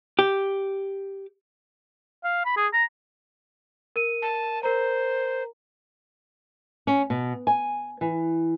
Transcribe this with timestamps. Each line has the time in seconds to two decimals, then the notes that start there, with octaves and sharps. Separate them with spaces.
0.19 G4
2.24 F5
2.45 B5
2.56 G#4
2.73 A#5
3.96 A#4 D#7
4.22 A5
4.63 A#4 C5 A#5
6.87 C#4
7.10 B2
7.47 G#5
8.01 E3